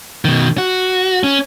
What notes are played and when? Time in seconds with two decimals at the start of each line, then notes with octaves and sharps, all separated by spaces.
0.25 B2 D#3
0.58 F#4
1.24 C#4